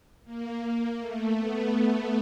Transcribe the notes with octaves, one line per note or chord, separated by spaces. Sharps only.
A#3
A3
B3